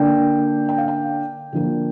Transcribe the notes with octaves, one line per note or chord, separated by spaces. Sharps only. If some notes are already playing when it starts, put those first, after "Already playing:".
Already playing: D3 A#3 D4 G5
G5
F5
G5
D3 F3 A#3